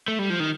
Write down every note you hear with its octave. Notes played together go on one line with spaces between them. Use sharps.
A3
G3
F3
D#3